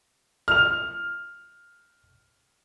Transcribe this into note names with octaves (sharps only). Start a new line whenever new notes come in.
F6 F7